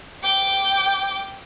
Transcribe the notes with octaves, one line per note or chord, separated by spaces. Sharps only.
G5 D6